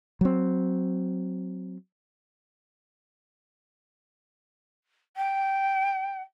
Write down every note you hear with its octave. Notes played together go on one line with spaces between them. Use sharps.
F#3 C4
G5